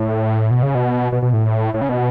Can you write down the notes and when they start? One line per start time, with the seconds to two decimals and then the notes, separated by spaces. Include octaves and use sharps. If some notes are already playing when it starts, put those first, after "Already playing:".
Already playing: A2
0.51 B2
0.63 C#3
0.75 B2
1.12 B2
1.22 B2
1.33 A2
1.74 A2
1.81 C#3
1.89 B2